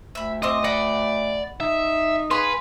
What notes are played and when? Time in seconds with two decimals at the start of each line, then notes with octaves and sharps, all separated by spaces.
0.15 D2 E5 B5
0.42 C4 D#5 C6 D6
0.64 D5 D#5 F#5 B5
1.60 D#4 E5
2.31 G#4 B4 F5 C6